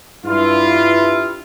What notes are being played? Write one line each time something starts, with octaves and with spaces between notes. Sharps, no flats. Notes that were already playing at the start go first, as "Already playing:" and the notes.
G2 E4 F4